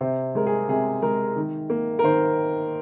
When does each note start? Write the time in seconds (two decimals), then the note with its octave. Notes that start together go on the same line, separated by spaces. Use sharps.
0.01 C3 C5
0.35 G#3 A#4
0.47 G#4
0.68 C3 G#4
1.02 G#3 A#4
1.36 D#3
1.70 A#3
1.99 A#4
2.04 D#3 C5